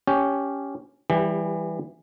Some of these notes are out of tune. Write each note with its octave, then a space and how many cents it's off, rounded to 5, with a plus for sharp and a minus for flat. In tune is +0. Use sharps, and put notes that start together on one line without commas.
C#4 +10 G4 +0 C#5 +10
E3 +0 G3 +0 G4 +30